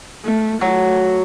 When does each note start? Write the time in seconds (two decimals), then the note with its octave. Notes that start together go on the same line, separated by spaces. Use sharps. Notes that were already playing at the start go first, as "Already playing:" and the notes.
0.25 A3
0.61 F#3 A3